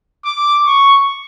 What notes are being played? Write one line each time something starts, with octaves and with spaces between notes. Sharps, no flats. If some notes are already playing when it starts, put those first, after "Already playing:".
D6
C#6